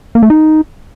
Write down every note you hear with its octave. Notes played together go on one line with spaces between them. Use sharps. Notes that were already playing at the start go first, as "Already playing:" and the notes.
A#3
A3
D#4